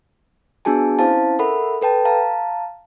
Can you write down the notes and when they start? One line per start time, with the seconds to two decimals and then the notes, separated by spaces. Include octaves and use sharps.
0.65 B3 D4 F#4 G#4 G#5 A5
0.99 C4 C#4 E4 C5 F5 A5
1.39 A4 A#4 E5 F#5 B5
1.82 A4 B4 G5 A5
2.05 F5 A5 A#5